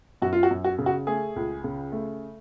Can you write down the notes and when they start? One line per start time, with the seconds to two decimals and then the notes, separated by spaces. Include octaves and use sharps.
0.22 F#2 F#4
0.33 F4
0.43 F#4
0.51 F#2
0.64 F#4
0.79 C#3
0.86 F#4
1.07 A3 G#4
1.36 C#2
1.64 C#3
1.92 A3